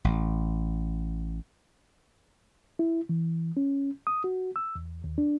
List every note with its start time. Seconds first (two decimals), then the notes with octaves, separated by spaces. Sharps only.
0.05 A1
2.79 E4
3.09 E3
3.57 C#4
4.07 D#6
4.24 F#4
4.56 E6
4.76 E2
5.04 D#2
5.18 D4